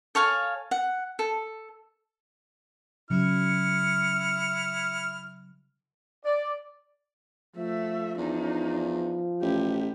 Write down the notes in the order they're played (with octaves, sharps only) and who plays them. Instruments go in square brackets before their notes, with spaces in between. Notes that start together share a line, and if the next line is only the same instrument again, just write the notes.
[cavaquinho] A4 C#5 F5 G#5
F#5
A4
[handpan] C#3 F#3 [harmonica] E4 F6 [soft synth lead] C#7
[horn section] D5
[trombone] F3 [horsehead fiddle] A3 E5
[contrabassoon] E2 [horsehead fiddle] D4 D#4
[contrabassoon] A1 [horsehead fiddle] G4